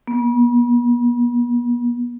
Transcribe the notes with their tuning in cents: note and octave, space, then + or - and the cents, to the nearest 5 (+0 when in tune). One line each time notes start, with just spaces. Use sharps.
B3 -40